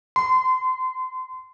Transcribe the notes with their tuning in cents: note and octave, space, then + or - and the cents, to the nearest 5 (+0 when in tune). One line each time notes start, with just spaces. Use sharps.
C6 -35